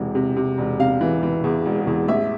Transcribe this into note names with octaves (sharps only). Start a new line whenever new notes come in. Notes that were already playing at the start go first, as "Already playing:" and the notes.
Already playing: E1 C3 E3
C3
C3
E1
C3 F5
E3
E3
E2
E1
E2
A1 E5